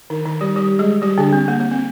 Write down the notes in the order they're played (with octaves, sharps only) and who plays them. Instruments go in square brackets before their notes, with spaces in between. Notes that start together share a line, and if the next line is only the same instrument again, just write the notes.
[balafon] D#3 D#4
D#3 D#4
G3 G4
G3 G4
G#3 G#4
G3 G4
D3 D4
C4
A#3
A#3
C4